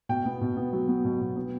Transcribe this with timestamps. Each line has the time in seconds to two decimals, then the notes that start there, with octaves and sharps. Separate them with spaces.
0.09 B2 G5
0.25 B3
0.41 B2
0.57 B3
0.73 F#3
0.88 B3
1.05 B2
1.21 B2
1.36 B3